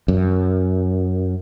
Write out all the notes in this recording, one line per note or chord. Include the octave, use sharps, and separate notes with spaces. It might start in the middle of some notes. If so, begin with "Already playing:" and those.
F#2